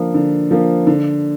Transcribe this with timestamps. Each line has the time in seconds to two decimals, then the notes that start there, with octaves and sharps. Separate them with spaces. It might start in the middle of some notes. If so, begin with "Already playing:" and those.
Already playing: D3 F3 A#3
0.14 D3
0.51 F3 A#3
0.87 D3